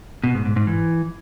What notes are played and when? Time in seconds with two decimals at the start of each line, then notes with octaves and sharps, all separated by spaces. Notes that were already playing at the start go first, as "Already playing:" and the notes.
0.24 B2
0.34 G#2
0.45 G#2
0.56 G#2
0.67 E3